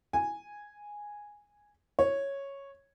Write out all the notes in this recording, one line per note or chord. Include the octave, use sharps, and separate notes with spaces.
G#5
C#5